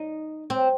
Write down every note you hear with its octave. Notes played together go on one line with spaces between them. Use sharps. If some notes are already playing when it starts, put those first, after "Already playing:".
Already playing: D#4
C4